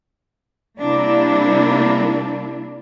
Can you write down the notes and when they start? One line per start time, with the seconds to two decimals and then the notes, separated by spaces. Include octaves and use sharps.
0.79 C3 G3 A#3 D4 E4